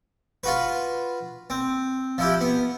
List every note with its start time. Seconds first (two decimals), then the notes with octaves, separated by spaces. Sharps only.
0.44 F4 F#4 B4
1.50 C4
2.18 F3 E4 G4
2.41 B3